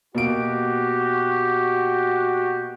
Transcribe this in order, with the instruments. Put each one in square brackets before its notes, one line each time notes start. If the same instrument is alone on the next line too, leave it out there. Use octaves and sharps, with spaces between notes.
[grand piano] B2 A#3 D7 [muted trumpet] F#4 [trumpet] G4